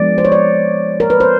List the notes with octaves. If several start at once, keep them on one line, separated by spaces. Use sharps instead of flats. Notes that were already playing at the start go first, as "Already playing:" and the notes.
Already playing: F3 G#3 B3 D5
C5
C#5
D5
A#4
B4
C5